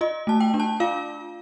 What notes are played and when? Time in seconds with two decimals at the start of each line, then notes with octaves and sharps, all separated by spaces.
0.01 F4 D#5
0.27 A3 A5
0.40 G5
0.54 D4
0.60 A5
0.80 F4 F5